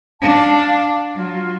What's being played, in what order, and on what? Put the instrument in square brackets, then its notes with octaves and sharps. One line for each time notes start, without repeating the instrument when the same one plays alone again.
[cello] D4 [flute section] F5 A5
[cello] F#3 [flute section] F4